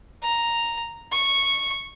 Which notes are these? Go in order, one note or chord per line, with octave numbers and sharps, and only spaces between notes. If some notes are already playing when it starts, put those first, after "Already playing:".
A#5
C#6